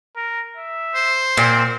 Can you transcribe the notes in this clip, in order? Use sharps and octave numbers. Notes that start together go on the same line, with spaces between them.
A#4
E5
C5
A#2 C4